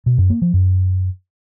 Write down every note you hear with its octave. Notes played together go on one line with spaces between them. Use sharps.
B2
F#2
A#3
F3
F#2